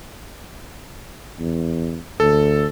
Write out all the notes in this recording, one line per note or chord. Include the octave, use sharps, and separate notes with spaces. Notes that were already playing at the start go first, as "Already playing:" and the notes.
E2
D2 A4